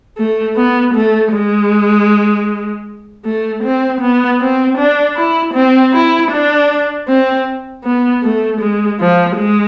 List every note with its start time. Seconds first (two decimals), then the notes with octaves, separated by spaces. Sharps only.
0.18 A3
0.56 B3
0.94 A3
1.32 G#3
3.25 A3
3.63 C4
4.01 B3
4.40 C4
4.78 D4
5.16 E4
5.54 C4
5.93 E4
6.31 D4
7.08 C4
7.84 B3
8.23 A3
8.61 G#3
8.99 F3
9.37 G#3